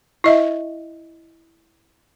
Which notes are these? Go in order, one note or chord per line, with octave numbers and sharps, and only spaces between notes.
E4 D#5 E5